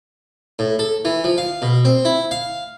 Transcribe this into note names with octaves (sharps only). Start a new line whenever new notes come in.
A2
A4
E3
F3
F5
B2
C4
E4
F5